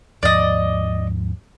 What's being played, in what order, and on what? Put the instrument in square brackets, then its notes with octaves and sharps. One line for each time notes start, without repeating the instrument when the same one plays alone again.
[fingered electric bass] D#2 G#2 F3 [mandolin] D5 D#5